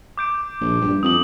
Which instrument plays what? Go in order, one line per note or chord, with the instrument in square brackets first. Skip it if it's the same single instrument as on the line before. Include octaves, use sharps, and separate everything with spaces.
[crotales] D6 G6 D7
[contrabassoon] A#1
G2
[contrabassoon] F2 [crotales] D#6 F#7